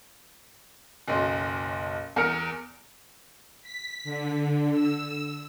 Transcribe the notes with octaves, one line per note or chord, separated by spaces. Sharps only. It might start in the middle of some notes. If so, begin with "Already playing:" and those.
F#1 B1 C6
E2 A#4 F6 C#7 D7
B6
D3
E6